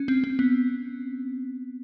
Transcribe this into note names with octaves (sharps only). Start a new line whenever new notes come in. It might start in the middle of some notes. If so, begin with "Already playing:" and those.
Already playing: C#4
C4
C4
B3